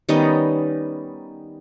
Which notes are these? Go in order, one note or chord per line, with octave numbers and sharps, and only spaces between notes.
D#3 G3 B3 C#4 D#4